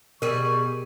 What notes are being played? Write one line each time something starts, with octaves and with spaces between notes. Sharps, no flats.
B2 G3 G#4 A#4 C#6